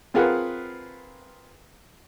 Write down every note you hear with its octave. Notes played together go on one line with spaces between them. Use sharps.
C4 F4 G#4 A#4 B4 F#5